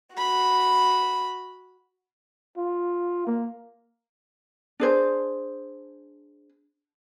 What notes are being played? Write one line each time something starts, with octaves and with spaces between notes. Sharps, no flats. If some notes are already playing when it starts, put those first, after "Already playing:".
F#4 B5
F4
A#3
D4 G#4 C5